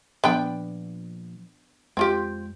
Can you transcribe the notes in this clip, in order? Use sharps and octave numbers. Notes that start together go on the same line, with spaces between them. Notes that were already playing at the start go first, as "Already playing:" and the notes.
A#2 F3 B3 D4 G5
F2 G#3 C4 F4 G4